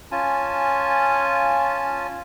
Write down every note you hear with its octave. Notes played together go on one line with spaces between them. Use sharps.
C#4 F4 G#5 A5